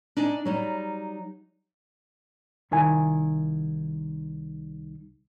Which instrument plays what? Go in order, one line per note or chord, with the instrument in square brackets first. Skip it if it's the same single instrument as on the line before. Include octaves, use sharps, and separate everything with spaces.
[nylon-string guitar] D4 D#4 G#5
F#3 G3 D#4
[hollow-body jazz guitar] C2 D#3 E4 G#5